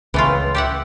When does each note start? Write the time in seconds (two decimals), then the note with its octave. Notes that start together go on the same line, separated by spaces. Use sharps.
0.14 C#2 E3 A3 F4
0.55 G4 E5 F#5